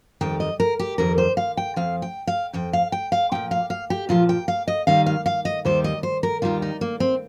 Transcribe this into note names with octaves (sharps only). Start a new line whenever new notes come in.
F2 D#3 G3 G5
D#5
A#4
G4
F2 D#3 G3 A#4
C5
F5
G5
F2 F3 F5
G5
F5
F2 F3 G5
F5
G5
F5
A#2 F3 G5
F5
F5
G4
A#2 F3 F4
G5
F5
D#5
D#2 D#3 G3 F5
F5
F5
D#5
D#2 D#3 G3 C5
D#5
C5
A#4
D#2 D#3 G3 F4
D#4
A#3
C4